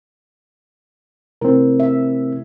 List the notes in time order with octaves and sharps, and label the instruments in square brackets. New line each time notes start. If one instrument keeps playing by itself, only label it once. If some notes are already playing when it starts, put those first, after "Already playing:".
[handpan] C3 A3 E4 [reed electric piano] C4 A#4
[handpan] E5